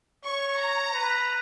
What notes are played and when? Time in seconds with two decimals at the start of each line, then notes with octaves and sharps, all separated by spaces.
0.25 C#5 C#6
0.59 A#5
0.93 B4